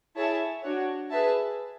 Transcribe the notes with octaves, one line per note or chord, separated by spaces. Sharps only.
E4 G#4 C#5 E5 A5
D4 F#4 C#5
G#4 B4 E5 A5